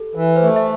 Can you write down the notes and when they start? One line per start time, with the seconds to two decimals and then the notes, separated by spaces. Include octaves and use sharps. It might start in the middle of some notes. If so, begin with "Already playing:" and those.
Already playing: G4 A4
0.15 E3
0.36 C5
0.43 A3
0.56 E5